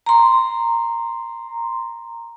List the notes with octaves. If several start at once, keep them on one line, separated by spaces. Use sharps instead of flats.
A#5 C6